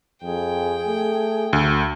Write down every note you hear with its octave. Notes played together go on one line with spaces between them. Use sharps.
F2 G#4 G5
A3
D2 F#4